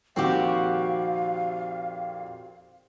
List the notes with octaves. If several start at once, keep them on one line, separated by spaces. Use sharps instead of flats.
F2 A#2 D#3 C4 F#4 G4 F5